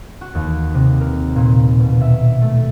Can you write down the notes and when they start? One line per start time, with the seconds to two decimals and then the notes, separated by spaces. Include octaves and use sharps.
0.21 F#4
0.35 D#2
0.74 C3
1.01 A#4
1.36 A#2
1.80 B2
2.01 E5
2.41 A3